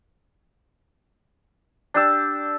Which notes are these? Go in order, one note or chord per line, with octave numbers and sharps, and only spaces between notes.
D4 G4 E6